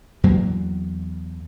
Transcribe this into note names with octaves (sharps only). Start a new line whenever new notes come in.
E2 F#3 A#3